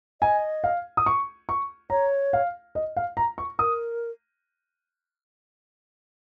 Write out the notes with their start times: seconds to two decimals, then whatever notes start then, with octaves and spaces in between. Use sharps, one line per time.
0.21 D#5 G#5
0.64 F5
0.97 D#6
1.06 C#6
1.49 C#6
1.90 C#5 A#5
2.33 F5
2.75 D#5
2.97 F5
3.17 A#5
3.38 C#6
3.59 A#4 D#6